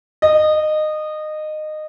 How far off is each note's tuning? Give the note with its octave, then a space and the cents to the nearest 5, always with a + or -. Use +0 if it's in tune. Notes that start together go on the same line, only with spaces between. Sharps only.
D#5 -20